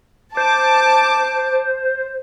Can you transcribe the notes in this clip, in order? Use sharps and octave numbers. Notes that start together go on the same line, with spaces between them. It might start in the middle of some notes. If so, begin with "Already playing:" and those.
C5 A5 D6